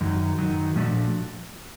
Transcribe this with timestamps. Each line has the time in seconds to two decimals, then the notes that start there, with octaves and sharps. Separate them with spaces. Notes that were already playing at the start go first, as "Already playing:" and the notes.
0.01 F#2 D#3 F#3
0.38 F#2 D#3 F#3
0.75 A#2 F3 A3 D4 F#4